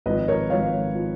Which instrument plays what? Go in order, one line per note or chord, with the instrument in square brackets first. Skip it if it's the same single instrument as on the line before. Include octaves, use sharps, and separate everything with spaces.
[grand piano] G#1 G#2 F3 B4 D#5
A#4 C#5
G#1 G#2 F3 C#5 F5
F3